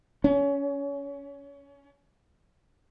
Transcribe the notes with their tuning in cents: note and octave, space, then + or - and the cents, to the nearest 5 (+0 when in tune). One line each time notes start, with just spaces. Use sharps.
C#4 +25